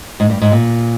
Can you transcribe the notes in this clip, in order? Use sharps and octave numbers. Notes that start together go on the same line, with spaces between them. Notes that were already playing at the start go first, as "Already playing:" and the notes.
G#2
G2
G#2
A#2